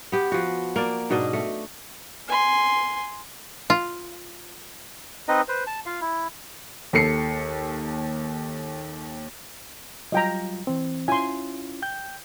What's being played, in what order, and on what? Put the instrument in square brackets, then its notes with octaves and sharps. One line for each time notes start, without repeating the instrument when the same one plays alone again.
[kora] B3 G4
F3 F#4
A#3 D5
G#2 B2 D4 D#5
A3
[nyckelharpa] G#5 C6
[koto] F4
[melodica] C4 D#4 B4 D#5
B4 C5
A5
F4 F5
E4
[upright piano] D#2 A4 C7 C#7
[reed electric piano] F#3 G3 F4 [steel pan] D#5 G5 A#5
[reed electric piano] E3 C4
[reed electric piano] C#4 E4 F4 [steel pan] G#5 C6
[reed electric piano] G5 G6